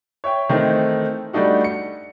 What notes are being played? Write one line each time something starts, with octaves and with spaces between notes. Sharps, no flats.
C#5 E5 G5
D#3 E3 A3 C4 D#4 C5
G3 A3 D4 D#4 F#4
C#7